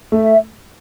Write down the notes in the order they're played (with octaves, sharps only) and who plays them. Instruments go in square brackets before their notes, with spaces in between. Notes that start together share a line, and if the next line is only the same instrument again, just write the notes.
[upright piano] A3 [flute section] E5